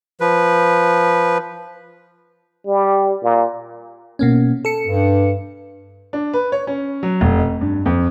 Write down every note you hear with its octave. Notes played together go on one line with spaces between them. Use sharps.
F3 B4
G3
A#2
B2 A#3 C#4
A4 C#7
G2
D4
B4
C#5
C#4
F#3
F1
D#5
G2
F2